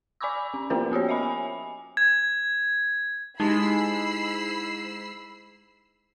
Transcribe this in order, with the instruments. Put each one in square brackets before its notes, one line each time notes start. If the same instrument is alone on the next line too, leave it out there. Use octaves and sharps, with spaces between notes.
[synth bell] D5 G#5 B5 C#6 D6 E6
C#4
F3 A#3 C#4 F4 A#4 C5
B3 F#4 G4 C#5
D#5 E5 G#5 B5
G#5
[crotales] G#6
[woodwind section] G#2 E4 [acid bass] G#3 [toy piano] D#4 G4 [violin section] B5 E6 C7